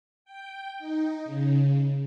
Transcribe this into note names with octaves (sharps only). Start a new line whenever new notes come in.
G5
D#4
C#3